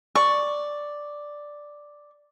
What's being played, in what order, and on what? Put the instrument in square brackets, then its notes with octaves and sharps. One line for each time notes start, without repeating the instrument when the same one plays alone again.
[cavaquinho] D5 C#6